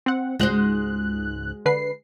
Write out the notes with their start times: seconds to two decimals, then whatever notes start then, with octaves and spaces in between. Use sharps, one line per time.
0.06 C4 F#5
0.39 C#2 G#2 G#3 F#4 C5 F#6
1.66 D3 B4 C7